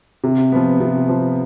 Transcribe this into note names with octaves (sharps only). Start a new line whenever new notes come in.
C3
F3 B3
C3
F3 B3